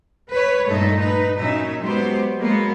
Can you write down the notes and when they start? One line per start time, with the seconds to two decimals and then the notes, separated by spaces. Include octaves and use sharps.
0.31 B4 C#5
0.67 G2 A#2 A3 D#4 A4 D#5
0.99 D#4 B4
1.37 A#2 F#3 C#4 D#4 E5
1.80 F#3 G#3 B3 G4 C5
2.39 F#3 G#3 A#3 B3